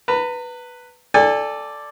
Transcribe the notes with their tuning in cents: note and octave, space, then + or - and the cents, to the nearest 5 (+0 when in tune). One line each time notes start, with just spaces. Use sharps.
B4 +0 A#5 -40
A4 +0 D5 +0 G#5 -35